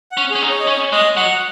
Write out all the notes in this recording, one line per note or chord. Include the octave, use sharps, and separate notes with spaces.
F#5
C#4
G#4
C#4
D#4
C#5
D#5
C#4 C#5
G#3 D#5
F#3 F#5